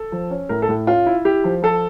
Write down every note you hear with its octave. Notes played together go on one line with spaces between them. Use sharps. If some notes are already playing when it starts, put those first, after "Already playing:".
Already playing: A4
F3
C#4
A2 A#4
A4
A2
C#4 F4
E4
E4 G4
F3
F3 A4